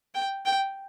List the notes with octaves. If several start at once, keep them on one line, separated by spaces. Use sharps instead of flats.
G5
G5